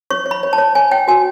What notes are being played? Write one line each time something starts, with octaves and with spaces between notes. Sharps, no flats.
C#5 C#6
C#5
B5
C#5
A5
C#5
C#5 G#5
C#5 G5
F#4 G#5